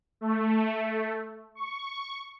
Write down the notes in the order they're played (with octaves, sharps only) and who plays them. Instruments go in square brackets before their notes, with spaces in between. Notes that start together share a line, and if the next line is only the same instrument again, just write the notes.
[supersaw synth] A3
C#6